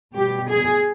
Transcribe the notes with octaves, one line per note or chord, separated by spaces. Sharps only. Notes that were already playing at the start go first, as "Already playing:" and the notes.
B2 G3 G4
G#4